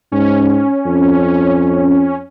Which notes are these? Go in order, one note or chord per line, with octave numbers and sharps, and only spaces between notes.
G#2 C#4
F2